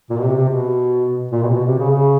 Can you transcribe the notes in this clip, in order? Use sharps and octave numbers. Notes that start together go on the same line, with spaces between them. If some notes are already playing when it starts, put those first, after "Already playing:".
A#2
B2
C3
C3
B2
A#2
B2
C3
B2
C3
C#3
C#3